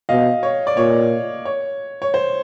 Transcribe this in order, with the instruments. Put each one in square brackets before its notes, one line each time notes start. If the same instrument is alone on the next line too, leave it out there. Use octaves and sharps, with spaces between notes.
[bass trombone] B2 [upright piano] D#5 F5
[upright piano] C#5
D5
[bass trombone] A#2 [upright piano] C#5
[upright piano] C#5
C#5
C5